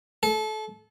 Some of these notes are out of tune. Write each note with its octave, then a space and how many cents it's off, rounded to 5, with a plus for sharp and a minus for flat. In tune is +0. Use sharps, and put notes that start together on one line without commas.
A4 -25